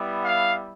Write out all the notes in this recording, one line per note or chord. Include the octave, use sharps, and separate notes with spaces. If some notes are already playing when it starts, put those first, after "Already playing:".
Already playing: G3 B3 E4
F5